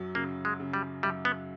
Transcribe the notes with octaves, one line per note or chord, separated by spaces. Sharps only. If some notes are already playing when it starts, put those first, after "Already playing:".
Already playing: F#2 F#3
C#3 A#3
G#3
C#3
G3
F#2 G3
B3